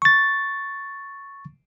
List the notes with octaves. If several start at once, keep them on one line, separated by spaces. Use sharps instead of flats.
C#6 A6